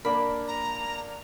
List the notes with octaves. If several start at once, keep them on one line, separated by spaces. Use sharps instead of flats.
A#3 D4 A#4 B5
A#5